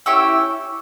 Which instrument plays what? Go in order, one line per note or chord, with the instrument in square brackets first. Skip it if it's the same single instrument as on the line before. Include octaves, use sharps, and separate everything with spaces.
[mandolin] C#4 E4 G4 C#6 E6